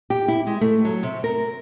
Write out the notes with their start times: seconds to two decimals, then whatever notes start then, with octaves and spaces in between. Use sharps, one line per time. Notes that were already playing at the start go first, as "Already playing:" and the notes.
0.10 G4
0.28 E4
0.47 G#3
0.61 A3
0.85 F#3
1.03 C3
1.24 A#4